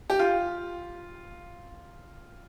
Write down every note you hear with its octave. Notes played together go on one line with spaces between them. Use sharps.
G4
F4